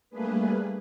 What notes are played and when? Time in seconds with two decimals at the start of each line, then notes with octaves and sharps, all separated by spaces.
0.10 G3 A3 A#3 D4 G#4 B4